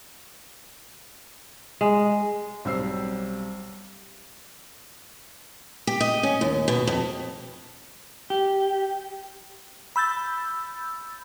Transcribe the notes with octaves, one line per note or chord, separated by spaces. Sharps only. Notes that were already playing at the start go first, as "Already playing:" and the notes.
G#3
B1 G3 C4 E6 C7
G4
D#5
C#4
D#2
B2
F2
G4
B5 E6 G6 A6